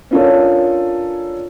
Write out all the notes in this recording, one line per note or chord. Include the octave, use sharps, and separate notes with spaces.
C#4 D4 F4 A4 A#4 C#5